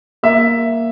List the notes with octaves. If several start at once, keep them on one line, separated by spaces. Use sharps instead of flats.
A#3 E5